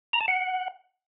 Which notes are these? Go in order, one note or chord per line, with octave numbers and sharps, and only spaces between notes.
A#5
A5
F#5